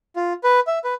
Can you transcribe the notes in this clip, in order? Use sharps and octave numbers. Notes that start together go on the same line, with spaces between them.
F4
B4
E5
B4